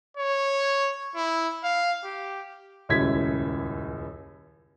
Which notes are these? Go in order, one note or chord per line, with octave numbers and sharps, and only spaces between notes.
C#5
E4
F5
G4
D#1 C#2 F#2 E4 G#6 B6